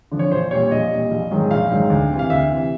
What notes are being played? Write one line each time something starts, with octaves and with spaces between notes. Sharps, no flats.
D3 F3
C#5
A#1 C5
A#2 G3 C#5
A#1 D#5
A#2 G3
A#1
G#2 D#3 F#3
A#1 F5
G#2 D#3 F#3
D2
C3 E3
F5
D2 E5
C3 E3